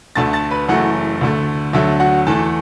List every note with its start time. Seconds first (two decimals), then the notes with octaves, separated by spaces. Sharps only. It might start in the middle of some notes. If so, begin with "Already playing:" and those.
0.15 D2 D3 A3 A5 A6
0.33 A5 A6
0.51 B4 B5
0.69 F#1 F#2 E3 A3 F#4 F#5
1.21 D2 D3 A3
1.73 D2 D3 F#3 A3 E5
2.00 F#4 F#5
2.27 E2 E3 A3 A4 A5